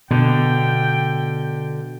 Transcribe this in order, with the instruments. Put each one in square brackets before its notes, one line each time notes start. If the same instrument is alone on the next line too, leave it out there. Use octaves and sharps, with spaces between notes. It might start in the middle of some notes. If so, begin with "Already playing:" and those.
[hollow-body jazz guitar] B2 [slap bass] D3 [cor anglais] G5